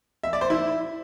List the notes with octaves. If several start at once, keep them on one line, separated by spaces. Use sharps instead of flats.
E5
D5
C5
E4